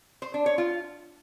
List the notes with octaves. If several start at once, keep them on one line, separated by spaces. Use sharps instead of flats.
C5
D4
C#5
F4